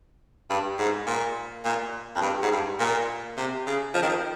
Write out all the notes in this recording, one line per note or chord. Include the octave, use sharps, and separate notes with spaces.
G2
G#2
A#2
A#2
F2
G2
G#2
G2
A#2
C3
C#3
F3
D#3
F3